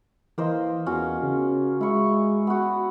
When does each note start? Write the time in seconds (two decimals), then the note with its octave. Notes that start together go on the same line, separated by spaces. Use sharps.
0.38 E3 A#3 C5 D#5
0.86 E2 C#4 F4 F#4
1.23 C#3
1.81 G#3 E4 C#6
2.47 B3 F#4